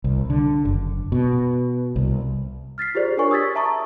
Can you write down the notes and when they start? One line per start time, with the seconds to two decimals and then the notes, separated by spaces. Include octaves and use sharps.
0.04 C2
0.30 D3
0.65 F#1
1.12 B2
1.96 C2
2.78 F6 A6 B6 C7
2.95 F4 G4 G#4 C5 D5
3.17 D4 G4 A#4 C#5 G#5 C#6
3.31 D#6 E6 G#6 A6 B6
3.55 E5 A5 A#5 C#6 D#6